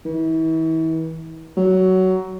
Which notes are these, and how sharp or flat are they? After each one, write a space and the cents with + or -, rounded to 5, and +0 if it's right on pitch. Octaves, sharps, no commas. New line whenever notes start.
E3 -35
F#3 +15